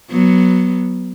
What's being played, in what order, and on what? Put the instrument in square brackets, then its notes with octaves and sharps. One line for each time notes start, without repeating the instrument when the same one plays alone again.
[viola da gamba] F#3 B3